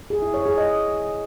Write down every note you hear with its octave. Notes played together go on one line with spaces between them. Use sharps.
G#4
E4
C#5
G#4
D#5